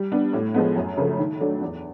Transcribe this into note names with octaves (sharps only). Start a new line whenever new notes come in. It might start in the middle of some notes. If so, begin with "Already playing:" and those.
Already playing: G3
B3 D4
A2
F3 G#3 B3
F#2
C#3 F3 A3
D#3
F#3 A3 D4
E2